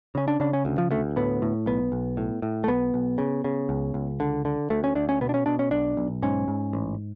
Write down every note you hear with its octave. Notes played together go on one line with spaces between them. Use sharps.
C#3 C#4
D4
C#3 D4
C#4
D2
F3
D2 A3
A2 B3
A2
B1 B3
B1
A2
A2
A3
B1 B3
B1
C#3
C#3
C#2
C#2
D3
D3
D2 A3
C#4
D2 D4
C#4
B2 B3
D4
C#4
B2 D4
C#4
B1 D4
B1
G#2 C#4
G#2
A1